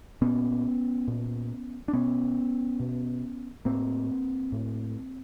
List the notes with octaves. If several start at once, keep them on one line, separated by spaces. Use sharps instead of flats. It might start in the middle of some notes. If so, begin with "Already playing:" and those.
A#2 B3 C#4
A#2
D4
B2 B3 C#4
B2
A2 A#3 C4
A2